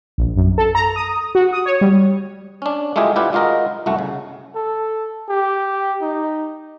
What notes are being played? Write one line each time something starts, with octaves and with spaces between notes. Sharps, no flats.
A#1
F#2
A4
A#5
D#6
F#4
D#6
C#5
G3
C#4 D4
G#3 A3 E4 F4 G4 G#4
E4 F4 G4 B4 D5 F#5
G#3 F4 F#4 A#4 D#5
C2 F#2 A3 F#4
C#3
A4
G4
D#4